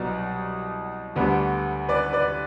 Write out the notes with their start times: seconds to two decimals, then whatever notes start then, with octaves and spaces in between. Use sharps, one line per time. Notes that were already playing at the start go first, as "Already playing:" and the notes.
Already playing: C2 B2 F#3 B3 D5
1.16 D2 D3 G3 B3
1.89 B4 D5
2.13 B4 D5